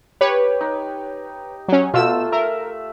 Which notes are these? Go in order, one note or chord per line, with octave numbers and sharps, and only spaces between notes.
G4 B4 C#5
D#4
F#3 C#4
B2 A3 F4 E6 E7
A#4 E5